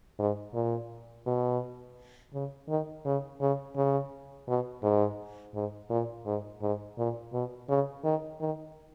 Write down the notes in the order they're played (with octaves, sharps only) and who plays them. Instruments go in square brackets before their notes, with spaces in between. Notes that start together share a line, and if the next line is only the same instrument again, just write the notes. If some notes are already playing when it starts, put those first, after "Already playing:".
[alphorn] G#2
A#2
B2
C#3
D#3
C#3
C#3
C#3
B2
G#2
G#2
A#2
G#2
G#2
A#2
B2
C#3
D#3
D#3